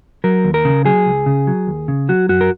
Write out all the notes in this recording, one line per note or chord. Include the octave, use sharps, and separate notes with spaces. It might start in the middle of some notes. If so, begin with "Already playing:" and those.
F#3 A#4
D#2
A#4
C#3
F#3 G#4
C#2
C#3
F#3
D#2
C#3
F#3 F#4
F#2 F#4
A#4